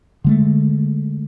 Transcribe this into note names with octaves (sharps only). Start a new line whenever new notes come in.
D3 G#3 A3